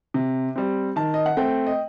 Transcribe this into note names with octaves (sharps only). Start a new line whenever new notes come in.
C3
G3 C4
D#3 A5
D#5
F#5
A3 C4 G5
D#5